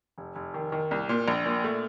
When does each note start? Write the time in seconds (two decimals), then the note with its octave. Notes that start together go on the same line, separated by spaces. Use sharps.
0.18 F1
0.35 F1
0.54 D#3
0.72 D#3
0.91 C2
1.09 A#2
1.28 A#1
1.46 A#2
1.64 A3